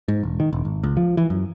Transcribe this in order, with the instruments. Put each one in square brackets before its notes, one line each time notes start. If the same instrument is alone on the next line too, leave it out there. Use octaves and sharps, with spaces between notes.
[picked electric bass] G#2
E1
D#3
E1
G#1
C#2
F3
E3
F#2